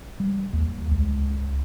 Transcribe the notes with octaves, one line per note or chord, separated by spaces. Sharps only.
G3
D#2
C#2